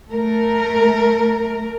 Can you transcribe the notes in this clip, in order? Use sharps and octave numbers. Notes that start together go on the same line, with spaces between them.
A3 A#4